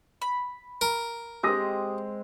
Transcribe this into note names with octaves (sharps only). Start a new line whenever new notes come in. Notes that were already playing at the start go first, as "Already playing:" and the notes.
B5
A#4
G#3 C4 G4 D#6 A#6